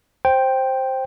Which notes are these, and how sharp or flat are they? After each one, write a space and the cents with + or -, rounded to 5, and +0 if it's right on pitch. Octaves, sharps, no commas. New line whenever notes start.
C5 +10 G5 +0